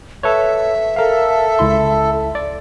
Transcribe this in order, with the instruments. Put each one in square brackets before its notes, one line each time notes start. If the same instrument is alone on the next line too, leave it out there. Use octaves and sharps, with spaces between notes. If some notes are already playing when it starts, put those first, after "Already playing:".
[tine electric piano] A4 B4 C#5 [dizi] E5
[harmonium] A4 [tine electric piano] A#4 F5
[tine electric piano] C#2 E4 C6
D5